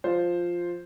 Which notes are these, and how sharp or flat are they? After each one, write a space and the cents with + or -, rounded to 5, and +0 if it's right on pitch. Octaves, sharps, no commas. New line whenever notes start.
F3 +0 F4 +0 C5 +0